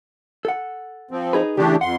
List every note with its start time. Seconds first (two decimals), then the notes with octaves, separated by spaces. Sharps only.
0.45 A4 F#5
1.11 F3 C4
1.33 D#4 G#4 B4
1.57 C#3 E3 A3 D4 G4
1.81 F2 F#5 C6